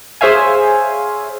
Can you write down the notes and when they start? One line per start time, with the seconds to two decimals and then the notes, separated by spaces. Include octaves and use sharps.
0.21 G#4 C5 C#5 E5 F5 G#5